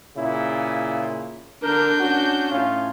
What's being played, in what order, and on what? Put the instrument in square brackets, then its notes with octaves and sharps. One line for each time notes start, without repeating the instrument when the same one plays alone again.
[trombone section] A#2 C#3 E4
[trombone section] D3 A#4 [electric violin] D4 G6
[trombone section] C#4 F#4
A2 C#4 F4